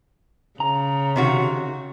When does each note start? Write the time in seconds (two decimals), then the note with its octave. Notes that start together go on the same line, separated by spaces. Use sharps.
0.60 C#3 A#5
1.16 C3 D#3 F#4